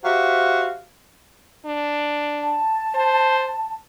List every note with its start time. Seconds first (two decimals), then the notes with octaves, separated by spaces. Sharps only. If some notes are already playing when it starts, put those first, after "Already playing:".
0.03 F#4 G4 C5 E5 F5
1.66 D4
2.42 A5
2.95 C5